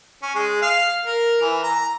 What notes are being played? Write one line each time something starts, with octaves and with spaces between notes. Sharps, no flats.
C#4
G#3
F5
A#4
E3
A#5